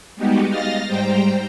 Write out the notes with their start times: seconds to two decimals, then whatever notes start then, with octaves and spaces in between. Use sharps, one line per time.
0.16 G3 G#3 B3 D#4 F#4 G4
0.49 D#5 F5 F6 A6 A#6
0.87 G#2 G3 C5 G5 A#5